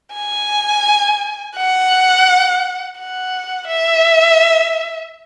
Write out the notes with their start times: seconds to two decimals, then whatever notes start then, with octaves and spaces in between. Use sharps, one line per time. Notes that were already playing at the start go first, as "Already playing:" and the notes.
0.14 G#5
1.56 F#5
2.99 F#5
3.69 E5